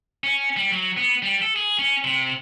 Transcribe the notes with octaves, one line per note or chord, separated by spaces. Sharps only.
C#4
G3
F#3
B3
G3
A4
G#4
C#4
C3